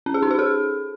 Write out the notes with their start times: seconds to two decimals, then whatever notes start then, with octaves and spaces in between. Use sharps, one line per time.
0.06 C#4
0.14 G#4
0.22 D#4
0.31 G#4
0.39 A4